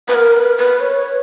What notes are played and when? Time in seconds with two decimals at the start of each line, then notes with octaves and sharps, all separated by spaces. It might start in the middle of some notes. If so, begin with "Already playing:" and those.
0.08 B4
0.15 A#4
0.37 B4
0.58 B4
0.81 C#5